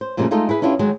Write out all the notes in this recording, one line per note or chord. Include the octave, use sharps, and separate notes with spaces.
C5
F#2 A#2 C#3 F3 G3 A3
G#3 A3 D#4 F4 A4 D#5
E4 G#4 B4
C#4 D4 E4 F4 G4
D3 D#3 F#3 G#3